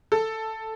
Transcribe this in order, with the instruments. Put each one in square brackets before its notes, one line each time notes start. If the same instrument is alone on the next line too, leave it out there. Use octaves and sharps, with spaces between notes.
[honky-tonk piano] A4